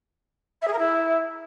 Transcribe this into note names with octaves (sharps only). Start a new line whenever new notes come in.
E5
G#4
A#4
E4